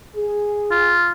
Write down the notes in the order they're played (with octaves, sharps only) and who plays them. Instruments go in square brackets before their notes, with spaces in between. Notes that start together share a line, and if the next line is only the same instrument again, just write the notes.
[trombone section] G#4
[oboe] F4